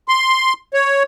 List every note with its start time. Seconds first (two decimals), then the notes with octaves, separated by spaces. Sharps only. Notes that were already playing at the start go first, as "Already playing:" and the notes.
0.08 C6
0.74 C#5